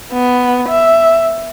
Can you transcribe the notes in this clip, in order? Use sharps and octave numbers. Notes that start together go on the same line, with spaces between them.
B3
E5